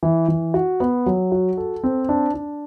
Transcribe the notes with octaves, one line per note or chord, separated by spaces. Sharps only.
E3
E3
F#4
B3
F#3
F#4
A4
C4
D4
D4